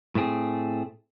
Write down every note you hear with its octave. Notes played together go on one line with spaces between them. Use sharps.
A2 A3 C4 G#4